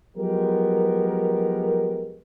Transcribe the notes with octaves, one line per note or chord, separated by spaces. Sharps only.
F3 F#3 G#3 B3 G4 A#4